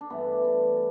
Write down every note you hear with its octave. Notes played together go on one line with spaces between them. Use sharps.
D4
G2 E3 A3 B3
D4